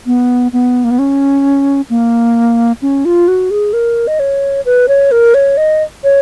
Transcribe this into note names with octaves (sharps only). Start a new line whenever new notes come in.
B3
B3
A#3
B3
C#4
A#3
C#4
F4
F#4
G#4
A#4
D#5
C#5
B4
C#5
A#4
C#5
D#5
C#5